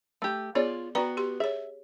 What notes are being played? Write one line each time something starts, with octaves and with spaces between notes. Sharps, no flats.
A3 G4
B3 F4 G#4 C#5 D5
B3 F#4 D5 G5 A#5
G4 C6
G#4 C#5 E5